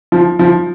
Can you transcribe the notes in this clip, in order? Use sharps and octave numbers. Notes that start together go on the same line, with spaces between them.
F3
F3